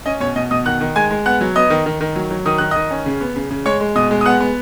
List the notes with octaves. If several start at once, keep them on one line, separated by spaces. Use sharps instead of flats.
C#4 D#5
B2 C#5
B2 D#5
B2 D#5 D#6
D#3 F#5 F#6
D#3
G#3 G#5 G#6
G#3
B3 F#5 F#6
F#3
B3 D#5 D#6
D#3
D#3
D#3
F#3
F#3
D#3 D#6
D#3 F#6
D#3 D#5 D#6
C#4
C#3
B3
C#3
C#3
G#3 C#5 C#6
G#3
B2 D#5 D#6
G#3
D#6
B3 F#5 F#6
B3